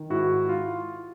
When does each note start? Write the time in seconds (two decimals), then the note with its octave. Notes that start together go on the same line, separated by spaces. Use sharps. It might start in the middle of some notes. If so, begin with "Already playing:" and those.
Already playing: D#3
0.10 G#2 E4 F#4
0.49 F4